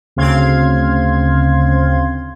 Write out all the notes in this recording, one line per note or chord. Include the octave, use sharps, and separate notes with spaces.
D2 C#3 C4 F5 C6 G#6